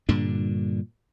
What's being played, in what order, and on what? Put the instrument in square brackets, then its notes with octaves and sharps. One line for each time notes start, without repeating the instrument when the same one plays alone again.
[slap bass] G2 A#2 D3 D4